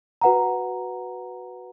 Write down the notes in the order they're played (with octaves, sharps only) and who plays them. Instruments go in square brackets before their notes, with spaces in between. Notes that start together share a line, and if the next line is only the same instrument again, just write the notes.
[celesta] F#4 B4 F#5 A#5